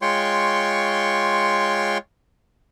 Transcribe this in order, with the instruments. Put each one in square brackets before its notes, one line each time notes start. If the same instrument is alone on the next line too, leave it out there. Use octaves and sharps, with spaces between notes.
[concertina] G#3 F4 C#5 G5 C6 C#6